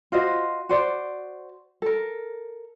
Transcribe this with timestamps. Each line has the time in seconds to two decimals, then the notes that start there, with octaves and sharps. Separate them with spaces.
0.12 F4 F#4 C5 D#5
0.69 F#4 C5 D5
1.82 A4 A#4